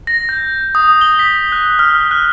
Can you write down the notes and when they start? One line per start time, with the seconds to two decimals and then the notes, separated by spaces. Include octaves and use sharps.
0.07 A#6
0.29 G6
0.75 D#6
1.01 G7
1.19 B6
1.52 F#6
1.79 F6
2.11 F#6